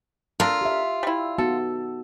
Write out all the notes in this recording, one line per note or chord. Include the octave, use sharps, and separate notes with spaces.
D4 F4 A4 A#4
G4 E5
G3 E4
B3 D#4 F#4 A4